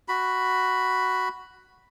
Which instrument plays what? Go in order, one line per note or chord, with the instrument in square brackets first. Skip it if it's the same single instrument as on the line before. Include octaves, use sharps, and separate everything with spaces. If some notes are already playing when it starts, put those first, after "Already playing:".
[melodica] F#4 B5